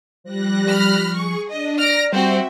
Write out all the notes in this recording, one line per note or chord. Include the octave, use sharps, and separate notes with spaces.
F3 G3 F#6 A#6
B5 F6
G#4 C#6
D4 D#5
D5 A#5 F6 A#6 D7
G3 C4 F#4 C5 E5